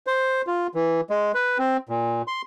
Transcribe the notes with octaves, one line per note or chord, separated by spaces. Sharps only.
C5
F4
E3
G#3
B4
C4
A#2
C6